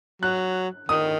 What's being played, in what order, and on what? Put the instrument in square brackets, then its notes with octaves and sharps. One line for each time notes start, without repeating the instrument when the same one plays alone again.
[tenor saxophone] F#3 [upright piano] F#6
[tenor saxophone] D#3 [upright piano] D#6